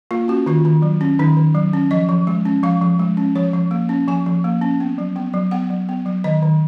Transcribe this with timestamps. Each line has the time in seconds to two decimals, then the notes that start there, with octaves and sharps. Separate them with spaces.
0.11 A#3 F4
0.28 C#4 F#4
0.46 D#3 F4
0.65 D#3
0.82 F#3
1.01 C#4
1.19 D#3 D#4
1.37 D#3
1.55 F#3
1.73 C#4
1.91 F3 D#5
2.09 F3
2.27 G#3
2.45 C#4
2.63 F3 F5
2.82 F3
2.99 G#3
3.17 C#4
3.35 F3 C#5
3.53 F3
3.71 A#3
3.89 C#4
4.08 F3 G#5
4.26 F3
4.44 A#3
4.62 C#4
4.80 B3
4.98 F#3
5.16 B3
5.34 F#3
5.51 B3 F#5
5.70 F#3
5.89 B3
6.06 F#3
6.24 D#3 D#5
6.43 D#3